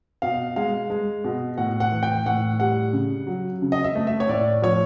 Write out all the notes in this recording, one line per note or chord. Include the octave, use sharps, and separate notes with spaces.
B2 F5
G#3 F5
G#3
B2
A2 F#5
F#5
E3
G5
A2 F#5
G3 F#5
C#3
F#3
C#3
D#5
E5
A3
E5
C#5
A2 D5
F3 C#5